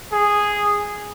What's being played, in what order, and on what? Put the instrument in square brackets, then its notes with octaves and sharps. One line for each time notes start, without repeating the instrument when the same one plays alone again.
[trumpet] G#4